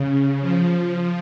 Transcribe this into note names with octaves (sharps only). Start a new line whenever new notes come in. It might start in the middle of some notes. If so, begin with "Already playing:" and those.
Already playing: C#3
F3